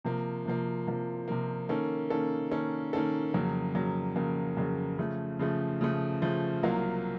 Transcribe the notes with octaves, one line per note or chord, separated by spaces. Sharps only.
C3 F3 A#3
C3 F3 A#3
C3 F3 A#3
C3 F3 A#3
D#3 A#3 C#4 A4
D#3 A#3 C#4 A4
D#3 A#3 C#4 A4
D#3 A#3 C#4 A4
F2 C#3 F#3 A#3
F2 C#3 F#3 A#3
F2 C#3 F#3 A#3
F2 C#3 F#3 A#3
C#3 F3 A3
C#3 F3 A3
C#3 F3 A3
C#3 F3 A3
C2 C3 F#3 A#3 F4